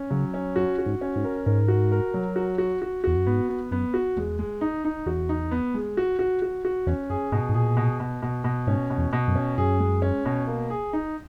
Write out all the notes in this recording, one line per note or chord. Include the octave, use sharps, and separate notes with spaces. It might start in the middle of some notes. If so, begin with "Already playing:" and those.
Already playing: C#4
C#3 F#3
C#4
F#2 F#4
F#4
G#2
C#4
G#2
A#4
G#2 A#4
F#4
A#4
F#3
F#4
F#4
F#4
E2 F#4
F#2
G#2 B3
B3
F#2 B3
F#4
E2 G#3
G#3
D#4
D#4
E2 F#4
D#4
B3
G#3
F#4
F#4
F#4
F#4
E2 C#4
F#2 G#4
G#2 B2
G#2
A#2 G#4
B2
B2
B2
B2
G#2 C#4
B2
E2
B2
F#2
C#4
F#2 G#4
G#3
C#4
B2
A#3
G#4
D#4